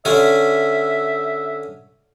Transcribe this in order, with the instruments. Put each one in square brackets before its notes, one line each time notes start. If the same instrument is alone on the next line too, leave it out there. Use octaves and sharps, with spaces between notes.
[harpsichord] D3 C#4 F#4 [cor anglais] E5